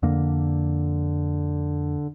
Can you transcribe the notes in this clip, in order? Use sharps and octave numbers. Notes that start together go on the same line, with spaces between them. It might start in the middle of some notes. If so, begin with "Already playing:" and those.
F2 D3 A#3